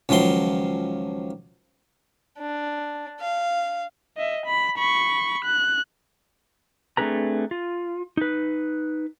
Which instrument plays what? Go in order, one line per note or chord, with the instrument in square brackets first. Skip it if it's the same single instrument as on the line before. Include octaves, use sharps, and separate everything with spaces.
[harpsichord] C#2 D#3 F3 F#3 C6
[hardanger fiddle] D4
F5
[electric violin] D#5 E5
B5
B5 C#6
F#6
[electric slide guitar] A3 C4 D4 G#4 B4 A#5
F4
D#4 B4